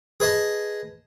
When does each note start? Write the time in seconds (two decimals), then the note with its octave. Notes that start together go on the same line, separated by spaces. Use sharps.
0.20 G#4 B4 D#5 A5